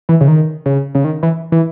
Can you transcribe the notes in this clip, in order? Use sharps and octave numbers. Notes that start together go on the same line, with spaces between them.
E3
C#3
D#3
C#3
C#3
D#3
E3
E3